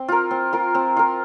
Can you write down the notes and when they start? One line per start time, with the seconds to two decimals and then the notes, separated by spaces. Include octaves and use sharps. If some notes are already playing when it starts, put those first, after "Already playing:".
Already playing: C4
0.08 F4 A#4
0.31 C4
0.53 F4 A#4
0.75 C4
0.96 F4 A#4